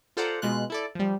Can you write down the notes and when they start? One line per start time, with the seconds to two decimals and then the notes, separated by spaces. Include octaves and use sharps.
0.17 F4 A4 C5 D5 F#5 A#5
0.42 B2 G#3 F4 F#6
0.70 E4 A4 D5
0.95 F3 G3